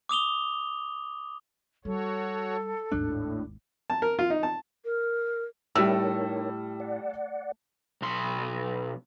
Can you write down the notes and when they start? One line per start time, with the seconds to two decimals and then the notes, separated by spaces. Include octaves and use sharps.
0.09 D6 D#6 F7 G7
1.85 G3 F#4 A4 C#5
2.91 G#1 D#2 A2 D4
3.90 A5
4.02 A#4
4.19 F4
4.30 D#4
4.43 A5
4.85 A#4
5.75 A2 G3 D#4 A#4 C#5 E6
6.80 D5 F#5
8.02 B1 C6